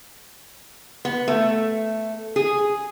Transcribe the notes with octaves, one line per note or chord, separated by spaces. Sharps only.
B3
A3
G#4